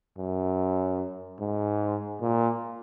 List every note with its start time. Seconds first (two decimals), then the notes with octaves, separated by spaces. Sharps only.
0.18 F#2
1.40 G#2
2.21 A#2